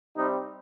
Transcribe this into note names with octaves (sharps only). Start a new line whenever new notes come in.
C3 G3 C4 D#4